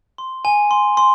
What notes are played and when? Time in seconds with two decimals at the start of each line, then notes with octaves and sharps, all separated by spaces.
0.18 C6
0.45 G#5
0.71 C6
0.97 C6